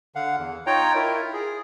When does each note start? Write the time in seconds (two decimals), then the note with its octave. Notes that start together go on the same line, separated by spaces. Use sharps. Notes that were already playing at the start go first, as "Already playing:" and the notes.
0.15 D3 F5 F#5
0.39 E2
0.66 D#4 F4 C#5 G5 A#5
0.95 E4 F4 A#4
1.33 G#4